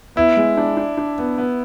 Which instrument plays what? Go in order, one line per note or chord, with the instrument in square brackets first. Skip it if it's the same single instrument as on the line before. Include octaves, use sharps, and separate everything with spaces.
[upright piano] B3 [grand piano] E4
[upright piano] G#3
D4
D4
D4
B3
B3